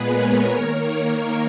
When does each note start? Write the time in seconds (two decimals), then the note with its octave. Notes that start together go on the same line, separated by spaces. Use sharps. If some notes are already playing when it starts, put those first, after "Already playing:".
Already playing: A#2 G#3 B3 G#4 B4
0.09 A#4 C#5
0.51 D#3 A#3